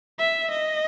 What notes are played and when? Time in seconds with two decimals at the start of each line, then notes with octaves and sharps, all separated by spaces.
0.19 E5
0.51 D#5